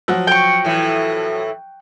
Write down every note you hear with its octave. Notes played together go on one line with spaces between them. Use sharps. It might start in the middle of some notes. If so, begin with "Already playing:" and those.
F3 F#3 F#5
G5 C#6
A2 E3